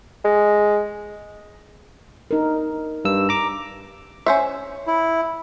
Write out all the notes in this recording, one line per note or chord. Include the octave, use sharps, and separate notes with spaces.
G#3
D4 D#4 A#4
G2 E6
A#5 D6
C#4 C5 E5
E4